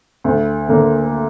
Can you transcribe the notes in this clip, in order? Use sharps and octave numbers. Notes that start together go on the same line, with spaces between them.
D2
D3 A#3